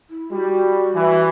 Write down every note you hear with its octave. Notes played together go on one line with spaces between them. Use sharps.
E4
G3 F#4
E3